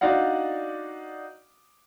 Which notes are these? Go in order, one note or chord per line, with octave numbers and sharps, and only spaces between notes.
D4 D#4 F#4 D5 F5 F#5